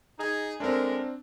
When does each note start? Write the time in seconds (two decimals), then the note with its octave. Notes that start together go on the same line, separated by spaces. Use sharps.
0.18 D#4 G#4
0.60 G#3 A3 C4 D4 A#4